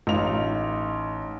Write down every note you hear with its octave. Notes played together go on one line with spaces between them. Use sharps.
A1 D#4 F4 F7